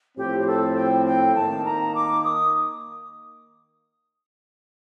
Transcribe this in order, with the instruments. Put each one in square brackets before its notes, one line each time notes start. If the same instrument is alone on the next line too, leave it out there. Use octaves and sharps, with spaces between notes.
[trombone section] A2 F3 C4 [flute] G4
[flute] G4
A4
G5
G5
[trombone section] D#3 A#3 D#4 [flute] A5
[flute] A#5
D6
D#6